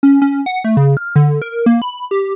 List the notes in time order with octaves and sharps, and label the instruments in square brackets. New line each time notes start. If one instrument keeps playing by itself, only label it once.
[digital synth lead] C#4
C#4
F#5
A3
C#3
F6
D3
A#4
A#3
B5
G4